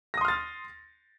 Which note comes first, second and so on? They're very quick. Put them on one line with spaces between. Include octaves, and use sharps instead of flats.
A#6 D#6 C6 F6 A6